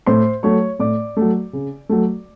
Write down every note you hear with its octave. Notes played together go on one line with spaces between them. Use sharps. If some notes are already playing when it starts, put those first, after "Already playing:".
A2 C5 C6
F#3 A3 C#5 C#6
A2 D5 D6
A3
F#3
C#3
F#3 A3